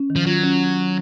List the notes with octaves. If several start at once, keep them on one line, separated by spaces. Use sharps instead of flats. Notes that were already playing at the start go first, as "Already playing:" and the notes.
Already playing: C#4
D#3
F3
F#3 F4
C#4